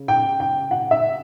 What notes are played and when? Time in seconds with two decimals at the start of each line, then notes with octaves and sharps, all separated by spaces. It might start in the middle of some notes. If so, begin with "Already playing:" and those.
Already playing: C#3
0.08 G5
0.40 G5
0.71 F#5
0.91 E5